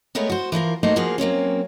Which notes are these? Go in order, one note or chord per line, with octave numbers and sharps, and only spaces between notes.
G#3 A3 B3 A#4 C#5
F#4 C5
E3 F3 F4 A#4
A3 A#3 D#4 F#4 C5
F3 A#3 F4 F#4 G#4
F#3 A#3 C4 C#4